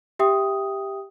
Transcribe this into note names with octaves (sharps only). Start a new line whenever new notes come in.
G4 E5 G5 D#6